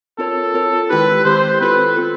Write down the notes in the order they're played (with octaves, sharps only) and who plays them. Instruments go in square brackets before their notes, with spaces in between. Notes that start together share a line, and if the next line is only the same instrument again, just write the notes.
[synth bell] C4 F4 A#4 C#5 [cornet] A4
[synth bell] C4 F4 A#4 C#5
[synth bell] D#3 G#3 C4 E4 G4 [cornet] B4
[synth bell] D#3 G#3 C4 E4 G4 [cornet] C5
[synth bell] C4 F4 A4 [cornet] B4
[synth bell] C4 F4 A4